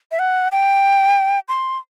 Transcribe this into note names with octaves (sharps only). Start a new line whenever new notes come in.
E5
F#5
G5
C6